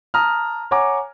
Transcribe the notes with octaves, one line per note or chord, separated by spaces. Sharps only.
A5 A#5 D#6 F6
C#5 F#5 G#5 A#5 D6